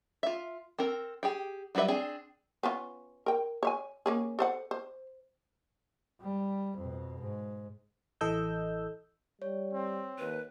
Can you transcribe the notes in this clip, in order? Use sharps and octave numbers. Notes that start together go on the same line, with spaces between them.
F4 E5
C4 A4 A#4
G4 G#4 G5
F#3 G3 D4 B4 E5
C4 D4 G#4
B3 C#4 F4
A#4 G5
C#5 E5 G#5
A#3 C#4 G#4
A4 C5 F#5
C5
G3
F2 B2
G#2
A1 E3 A4 D#5 E6 G6
G3 C#5
C4
D#2 B4